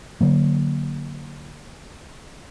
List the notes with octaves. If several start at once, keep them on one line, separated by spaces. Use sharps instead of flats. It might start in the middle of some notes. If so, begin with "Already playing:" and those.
D3 F#3 A#3